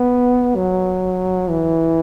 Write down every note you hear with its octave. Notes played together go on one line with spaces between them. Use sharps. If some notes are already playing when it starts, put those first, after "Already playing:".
Already playing: B3
F#3
E3